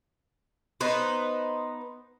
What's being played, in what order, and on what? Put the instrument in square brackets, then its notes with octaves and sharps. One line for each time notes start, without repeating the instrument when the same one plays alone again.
[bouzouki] B3 D#4 B4 C5